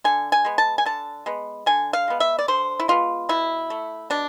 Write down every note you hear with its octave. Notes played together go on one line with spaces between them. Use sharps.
D3 G#5
G#5
G#3 B3
A5
G#5
D3 A5
G#3 B3
D3 G#5
F5
G#3 B3
E5
D5
D3 C5
E4
G#3 B3 F4
B2 E4
A3
B2 D4